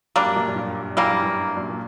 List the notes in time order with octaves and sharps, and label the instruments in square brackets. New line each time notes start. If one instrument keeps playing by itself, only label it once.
[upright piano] F#2 [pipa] G3 A#3 D4
[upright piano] G2
F#2 A#2
F#2 A#2
G2
[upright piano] F#2 [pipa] E3 G3 A#3
[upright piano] G2
G2
F#2 A#2
A#2